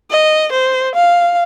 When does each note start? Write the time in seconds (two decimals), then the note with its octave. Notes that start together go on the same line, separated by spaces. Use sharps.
0.10 D#5
0.52 C5
0.95 F5